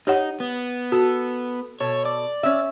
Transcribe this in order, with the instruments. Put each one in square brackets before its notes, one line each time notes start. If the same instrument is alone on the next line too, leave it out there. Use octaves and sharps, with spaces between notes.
[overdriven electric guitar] D#4 [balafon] G4 C#5 F#5
[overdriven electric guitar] B3
[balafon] F#4 [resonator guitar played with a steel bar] A4
[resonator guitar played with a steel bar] B2 A4 [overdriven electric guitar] C#5
[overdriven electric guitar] D5
[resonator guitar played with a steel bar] C#4 E5